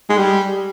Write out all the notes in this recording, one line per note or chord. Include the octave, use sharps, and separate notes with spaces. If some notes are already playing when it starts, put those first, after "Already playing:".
G#3
G3